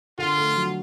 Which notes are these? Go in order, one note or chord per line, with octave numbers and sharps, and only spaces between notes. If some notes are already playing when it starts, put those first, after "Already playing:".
D3 F4
A3
F#3